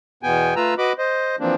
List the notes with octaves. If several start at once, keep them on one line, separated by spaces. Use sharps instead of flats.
E2 B2 B3 G5 G#5
A3 F4 B4 A#5 E6
F#4 B4 D#5 B5 D6
C5 D#5
E3 F3 A#3 C4 D4